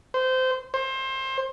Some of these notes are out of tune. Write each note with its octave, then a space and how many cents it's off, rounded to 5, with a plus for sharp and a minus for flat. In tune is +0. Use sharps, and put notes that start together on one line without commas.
C5 -20
C5 +25